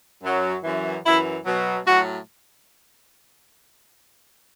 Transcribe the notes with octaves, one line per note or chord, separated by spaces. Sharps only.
F#2 F#3
F#2 E3
F#2 E3 E4
B2 F#3
A2 F#3 F#4